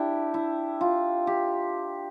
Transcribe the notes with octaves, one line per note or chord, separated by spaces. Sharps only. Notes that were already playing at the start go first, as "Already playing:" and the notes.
Already playing: D4 E4 G4
E4
F4
G4